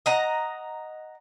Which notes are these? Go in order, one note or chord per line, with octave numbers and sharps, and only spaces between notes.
D#5 F#5 A#5